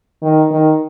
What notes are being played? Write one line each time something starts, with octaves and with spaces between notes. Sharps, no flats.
D#3
D#3